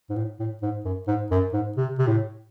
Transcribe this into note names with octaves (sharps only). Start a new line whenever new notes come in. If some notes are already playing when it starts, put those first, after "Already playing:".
G#2
A2
A2
G#2
F#2
G#2
F#2
G#2
C3
C3
A2